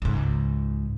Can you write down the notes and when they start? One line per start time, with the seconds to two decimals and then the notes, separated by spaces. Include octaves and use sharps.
0.02 C#2 G#2